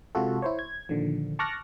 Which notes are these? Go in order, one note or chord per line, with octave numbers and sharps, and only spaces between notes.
C3 G#3 F4 F#4 A4
E4 C5 C#5
G#6
A#2 D3 D#3 F3
A5 C#6 D6 F6 F#6 A#6